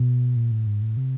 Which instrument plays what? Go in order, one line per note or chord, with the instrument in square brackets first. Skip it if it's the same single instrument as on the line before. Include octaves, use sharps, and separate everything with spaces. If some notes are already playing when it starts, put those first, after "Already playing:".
Already playing: [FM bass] B2
A#2
A2
G#2
A2
C3